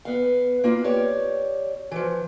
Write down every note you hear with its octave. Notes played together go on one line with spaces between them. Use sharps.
B3 F5
A#3 F4 B4
G4 C#5 D5
E3 F3